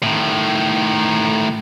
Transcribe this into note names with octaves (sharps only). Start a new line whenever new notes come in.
A2 D#3